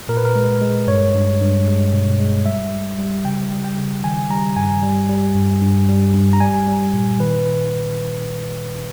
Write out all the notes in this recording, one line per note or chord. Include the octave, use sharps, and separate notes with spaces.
A#2 A#4
B4
A#4
G#3
G#3
G2 C#5
G2
G2
G#3
B2
G#3
G3 E5
G3
G3
C#3 G5
G3
G5
C#3
D#3 G#5
G3 A#5
G2 G#5
G3
G3
G2
G2
G3
G2
A#5
G3 G#5
G3
A#2
D#3 B4